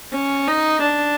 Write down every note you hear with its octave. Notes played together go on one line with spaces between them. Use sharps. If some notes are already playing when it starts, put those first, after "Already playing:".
C#4
D#4
D4